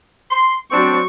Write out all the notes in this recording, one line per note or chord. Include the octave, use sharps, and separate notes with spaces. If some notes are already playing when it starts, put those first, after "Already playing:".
C6
F#3 C4 D4 C#6